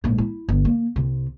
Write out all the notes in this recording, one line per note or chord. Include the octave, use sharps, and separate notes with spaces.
A#1 G#2
E4
G1
A#3
C2 C3